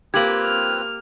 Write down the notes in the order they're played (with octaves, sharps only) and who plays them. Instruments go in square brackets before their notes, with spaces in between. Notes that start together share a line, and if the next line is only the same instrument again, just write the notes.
[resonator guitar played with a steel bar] A#3 G4 [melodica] C4 F4 B4 [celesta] G#6 F#7
[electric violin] F6